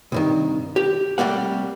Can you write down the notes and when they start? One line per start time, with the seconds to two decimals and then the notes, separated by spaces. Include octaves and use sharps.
0.12 C2 G2 D#3
0.76 G4
1.18 C2 G3 A3 A#3 F#5